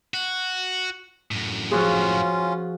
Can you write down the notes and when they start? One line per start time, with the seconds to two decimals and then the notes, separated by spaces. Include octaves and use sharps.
0.14 F#4
1.31 F#2 A2
1.71 F3 C#4 F4 F#4 G#4